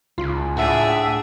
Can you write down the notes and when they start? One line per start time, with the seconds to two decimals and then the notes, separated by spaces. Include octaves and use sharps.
0.18 C#2 F4
0.57 A2 D4 G#4 E5 F#5